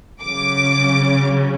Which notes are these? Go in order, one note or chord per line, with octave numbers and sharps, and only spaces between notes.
C#3 F#3 C#4 D6